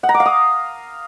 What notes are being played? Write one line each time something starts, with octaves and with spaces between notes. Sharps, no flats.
F#5
A#5
D6
F5
D#6